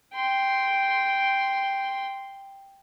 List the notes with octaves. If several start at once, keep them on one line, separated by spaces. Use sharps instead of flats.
G5 C6